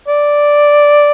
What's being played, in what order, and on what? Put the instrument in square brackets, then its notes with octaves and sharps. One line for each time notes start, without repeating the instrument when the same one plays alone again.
[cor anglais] D5